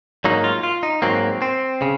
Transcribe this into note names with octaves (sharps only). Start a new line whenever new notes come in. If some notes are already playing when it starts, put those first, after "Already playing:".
G#2 F#3 A#3 D#4
F4
F4
D#4
G#2 F#3 A#3 C4
C4
C#3